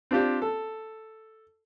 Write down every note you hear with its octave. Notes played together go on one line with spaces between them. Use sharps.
C4 D4 F4 G4 C5
A4